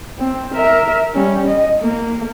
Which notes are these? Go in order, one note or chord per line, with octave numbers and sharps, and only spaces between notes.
C4
A#4 E5
G3 C#4
D#5
A#3